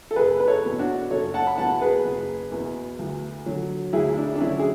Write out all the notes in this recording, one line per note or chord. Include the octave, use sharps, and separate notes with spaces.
A4
F#1 G#4 B4
B4
A4 C#5
E2 B2
D4 F#4
F#1 A4 C#5
F#5 A5
B5
E2 B2 F#5 A5
G#4 B4
F#1
E2 B2
D2
D3 F#3
D2 E4 G#4
E4
D4
D4
D3 F#3 C#4 E4
G#4